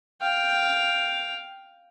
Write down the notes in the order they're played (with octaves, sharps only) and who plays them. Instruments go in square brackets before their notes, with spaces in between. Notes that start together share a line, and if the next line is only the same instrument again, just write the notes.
[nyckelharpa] F5 G5